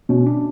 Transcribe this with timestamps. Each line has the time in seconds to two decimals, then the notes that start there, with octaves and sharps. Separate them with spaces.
0.09 B2 C#4
0.27 D4